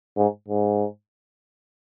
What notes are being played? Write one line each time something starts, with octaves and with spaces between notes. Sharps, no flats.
G#2
G#2